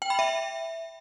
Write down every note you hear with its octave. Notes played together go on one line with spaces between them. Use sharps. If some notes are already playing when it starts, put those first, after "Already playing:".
G5
B5
E5